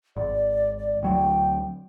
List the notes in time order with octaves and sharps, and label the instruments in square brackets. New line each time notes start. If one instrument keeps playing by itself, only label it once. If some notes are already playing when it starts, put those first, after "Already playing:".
[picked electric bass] G#1 [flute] D5
[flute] D5
[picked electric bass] D2 F#3 [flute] G5